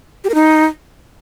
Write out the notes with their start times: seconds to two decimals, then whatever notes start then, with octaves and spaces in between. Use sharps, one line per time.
0.24 G4
0.29 A#4
0.34 D#4